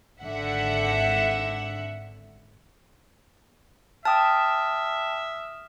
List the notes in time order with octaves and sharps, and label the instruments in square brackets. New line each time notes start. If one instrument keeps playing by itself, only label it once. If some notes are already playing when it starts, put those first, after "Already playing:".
[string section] G#1 D3 E5 F#5
[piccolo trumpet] E5 [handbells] G5 A5 [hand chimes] D#6 F6